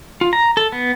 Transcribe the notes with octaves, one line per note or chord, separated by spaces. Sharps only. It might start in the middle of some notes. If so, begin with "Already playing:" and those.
F4
A#5
A4
B3